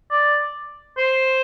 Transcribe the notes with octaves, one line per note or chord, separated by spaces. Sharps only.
D5
C5